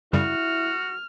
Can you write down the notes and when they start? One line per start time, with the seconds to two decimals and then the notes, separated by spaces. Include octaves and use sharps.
0.13 F#2 C#3 G3 E4 F#4 F6